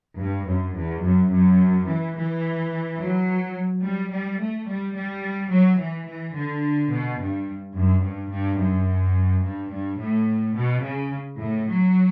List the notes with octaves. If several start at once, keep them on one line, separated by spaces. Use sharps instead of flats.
G2
F#2
E2
F#2
F#2
E3
E3
F#3
G3
G3
A3
G3
G3
F#3
E3
E3
D3
B2
G2
F#2
G2
G2
F#2
G2
G2
A2
B2
C#3
A2
F#3